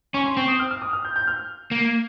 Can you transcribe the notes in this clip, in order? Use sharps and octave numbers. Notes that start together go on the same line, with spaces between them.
C#4 C#6
C6
C4 C#6
D#6
F6
F6
D#6
F6
G6
G6
F6
A#3